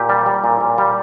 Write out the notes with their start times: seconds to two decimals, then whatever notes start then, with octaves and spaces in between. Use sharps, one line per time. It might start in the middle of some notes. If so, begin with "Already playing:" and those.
Already playing: A#2 G4
0.09 G3
0.26 G3
0.44 A#2
0.61 A#2
0.78 G3